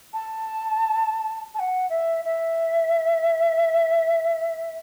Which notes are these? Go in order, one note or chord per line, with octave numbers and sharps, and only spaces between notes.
A5
A5
F#5
E5
E5